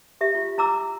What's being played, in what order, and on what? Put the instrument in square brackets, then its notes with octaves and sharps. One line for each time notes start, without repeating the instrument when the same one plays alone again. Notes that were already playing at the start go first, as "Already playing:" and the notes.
[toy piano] G4 E5
F4
E4 A#5 D6 E6